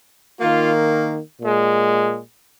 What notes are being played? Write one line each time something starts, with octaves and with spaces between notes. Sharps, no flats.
D#3 A#3 F4
A#2 G#3